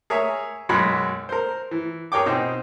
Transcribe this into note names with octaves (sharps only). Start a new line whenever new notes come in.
G#4 A#4 C#5 E5
B1 F#2 G#3 F#4 B5
A#4 C5
E3
G#4 A#4 C#5 G5 D6
B2 C4 D#4